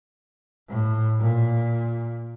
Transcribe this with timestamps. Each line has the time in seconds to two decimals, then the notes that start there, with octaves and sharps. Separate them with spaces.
0.69 A2
1.20 A#2